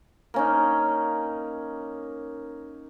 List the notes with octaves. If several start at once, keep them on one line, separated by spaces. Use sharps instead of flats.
A#3 C#4 D#4